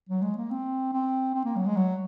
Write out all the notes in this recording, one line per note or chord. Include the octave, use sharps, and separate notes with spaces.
F#3
G#3
A#3
C4
C4
C4
A#3
F#3
G#3
F#3